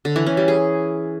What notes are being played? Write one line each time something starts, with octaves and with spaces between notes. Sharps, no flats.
D3
E3
C#4
G3
G#4